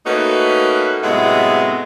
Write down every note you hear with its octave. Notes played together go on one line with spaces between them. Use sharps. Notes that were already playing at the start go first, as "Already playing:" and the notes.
A3 A#3 C#4 D#4 F#4 B4
A2 C3 F#3 G#3 B3 E4